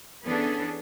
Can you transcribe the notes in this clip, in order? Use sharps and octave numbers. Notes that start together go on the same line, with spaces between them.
E3 B3 C#4 D4 G#4 A4